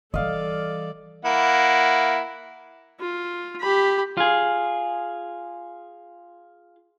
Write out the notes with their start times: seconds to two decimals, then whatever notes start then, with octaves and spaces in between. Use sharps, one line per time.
0.14 E3 G3 A4 D5 D#5 F5
1.25 A#3 E4 F#5
3.00 F4
3.60 G4 B5
4.17 F4 G#4